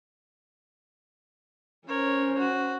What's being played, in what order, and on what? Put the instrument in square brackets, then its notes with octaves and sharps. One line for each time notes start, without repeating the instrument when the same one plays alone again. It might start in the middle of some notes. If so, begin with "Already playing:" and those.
[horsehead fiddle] C#4 C5 [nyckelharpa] A#4 C#5
[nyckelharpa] F#4